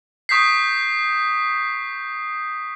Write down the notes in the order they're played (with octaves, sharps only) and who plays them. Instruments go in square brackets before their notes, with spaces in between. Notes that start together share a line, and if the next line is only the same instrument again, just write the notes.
[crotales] C#6 D#6 G6 B6 C7